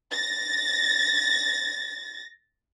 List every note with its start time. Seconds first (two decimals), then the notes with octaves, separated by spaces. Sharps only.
0.11 A6 A#6